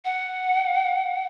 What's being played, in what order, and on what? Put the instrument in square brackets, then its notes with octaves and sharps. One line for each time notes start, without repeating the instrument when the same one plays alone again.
[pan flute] F#5